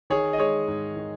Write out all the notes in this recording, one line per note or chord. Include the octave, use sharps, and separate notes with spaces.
D#3 G#4 C#5
D#5
G#3 G#4 C#5
G#2
D#3